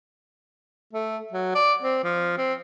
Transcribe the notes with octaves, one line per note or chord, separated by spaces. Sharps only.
A3
F#3
D5
C4
F3
C4